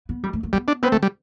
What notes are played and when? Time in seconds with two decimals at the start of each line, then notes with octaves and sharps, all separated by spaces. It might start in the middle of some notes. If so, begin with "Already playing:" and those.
0.09 B3
0.23 G3
0.33 A3
0.43 A3
0.53 G3 B3
0.68 D4
0.83 B3 C4
0.92 D3 A3
1.03 G3